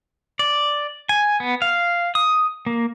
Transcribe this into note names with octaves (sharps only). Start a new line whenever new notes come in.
D5
G#5
B3
F5
D#6
A#3